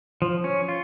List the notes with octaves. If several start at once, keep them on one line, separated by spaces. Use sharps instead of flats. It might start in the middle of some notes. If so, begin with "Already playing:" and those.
F3
C#4
F4